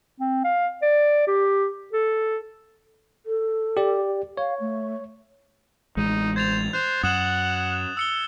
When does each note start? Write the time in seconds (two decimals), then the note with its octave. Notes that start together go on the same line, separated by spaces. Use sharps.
0.20 C4
0.44 F5
0.82 D5
1.27 G4
1.93 A4
3.26 A4
3.77 G4 D5
4.37 C#5 F5
4.60 A3
5.97 A1 G#3 D#4
6.36 C5 G#6 A6 F7
6.73 C5 F#6
7.03 F#2 F#5 D#6 E7 F#7
7.97 E6 C#7 G7